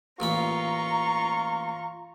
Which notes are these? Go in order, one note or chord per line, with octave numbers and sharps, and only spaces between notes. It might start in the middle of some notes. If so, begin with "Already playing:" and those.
A1 A#2 F4 A#5 B5 C#6